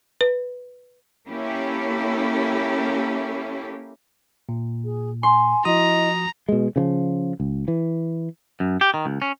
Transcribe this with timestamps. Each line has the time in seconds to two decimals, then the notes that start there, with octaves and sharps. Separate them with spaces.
0.21 B4
1.28 A#3 C#4 E4 G4 A4
4.49 A#2
4.83 G#4
5.23 G#5 C6
5.65 F3 E4 F#4 D#5 A#5 D#6
6.49 B2 G#3
6.76 C#3 E3 F3
7.40 C#2
7.68 E3
8.60 F#2
8.81 G4
8.94 D#3
9.06 C#2
9.22 C#4